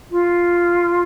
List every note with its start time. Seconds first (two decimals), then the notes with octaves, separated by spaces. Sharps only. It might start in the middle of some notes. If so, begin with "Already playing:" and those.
0.11 F4